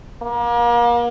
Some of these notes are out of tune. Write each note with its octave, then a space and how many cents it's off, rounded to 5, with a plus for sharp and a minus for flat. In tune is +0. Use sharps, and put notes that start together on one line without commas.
A#3 +35